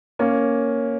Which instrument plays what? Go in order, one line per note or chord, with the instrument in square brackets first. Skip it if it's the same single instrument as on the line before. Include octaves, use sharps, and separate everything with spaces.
[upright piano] A#3 C#4